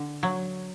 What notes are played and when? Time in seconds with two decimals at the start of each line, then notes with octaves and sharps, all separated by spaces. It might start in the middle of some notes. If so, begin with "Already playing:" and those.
Already playing: D3
0.23 F#3